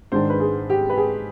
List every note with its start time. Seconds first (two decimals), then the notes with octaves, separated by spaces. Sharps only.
0.12 G#2 D#3 G#3 D4 C5
0.30 B4
0.40 G#4
0.70 G4
0.90 B4
0.98 G#4